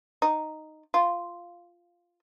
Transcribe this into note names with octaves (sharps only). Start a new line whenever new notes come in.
D#4
F4